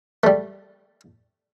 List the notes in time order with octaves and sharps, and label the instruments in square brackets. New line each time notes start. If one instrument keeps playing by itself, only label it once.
[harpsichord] G3 A3